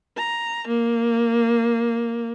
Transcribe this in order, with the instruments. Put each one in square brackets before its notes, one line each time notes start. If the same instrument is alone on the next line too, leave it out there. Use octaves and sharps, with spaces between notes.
[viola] A#5
A#3